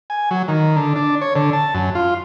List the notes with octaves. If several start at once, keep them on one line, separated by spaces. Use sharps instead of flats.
G#5
F#3
D#3
D3
D4
C#5
D3
A5
F#2
F4